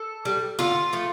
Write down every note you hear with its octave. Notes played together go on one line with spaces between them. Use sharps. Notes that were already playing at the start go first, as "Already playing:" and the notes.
Already playing: A4
G3
D3 F4
F3 A3